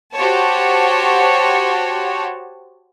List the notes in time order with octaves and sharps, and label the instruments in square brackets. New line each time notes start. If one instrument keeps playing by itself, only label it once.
[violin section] F#4 G4 C5 C#5 A5